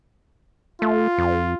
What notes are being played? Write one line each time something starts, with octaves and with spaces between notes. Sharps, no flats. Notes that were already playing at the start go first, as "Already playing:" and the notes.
A3 F4
F2